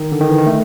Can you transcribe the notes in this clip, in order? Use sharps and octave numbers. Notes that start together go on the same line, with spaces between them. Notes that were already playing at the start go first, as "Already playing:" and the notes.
Already playing: D#3
D3
D#3
E3
D#3
A3